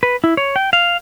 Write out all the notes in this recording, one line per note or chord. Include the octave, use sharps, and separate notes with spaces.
B4
E4
C#5
G5
F5